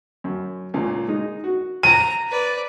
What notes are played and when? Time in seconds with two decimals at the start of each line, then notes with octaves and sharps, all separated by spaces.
0.24 F#2
0.74 C#2 A#2
1.08 G#3 D#4
1.44 F#4
1.83 A#5 D#7
2.29 B4 D5